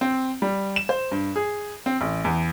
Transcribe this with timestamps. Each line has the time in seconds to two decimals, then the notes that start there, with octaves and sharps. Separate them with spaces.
0.01 C4
0.42 G3
0.76 E7
0.89 C5
1.12 G2
1.36 G#4
1.86 C4
2.01 A1
2.25 E2